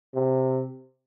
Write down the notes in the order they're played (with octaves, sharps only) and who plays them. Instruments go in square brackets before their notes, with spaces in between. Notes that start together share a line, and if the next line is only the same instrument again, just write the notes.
[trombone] C3